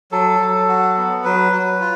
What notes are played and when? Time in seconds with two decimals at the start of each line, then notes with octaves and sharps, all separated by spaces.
0.12 F#3 A4
0.40 F#3
0.68 F#4
0.97 B3
1.24 F#3 B4
1.52 F#3
1.81 F4